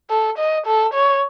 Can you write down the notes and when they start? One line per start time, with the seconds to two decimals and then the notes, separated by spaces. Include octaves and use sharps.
0.10 A4
0.38 D#5
0.67 A4
0.94 C#5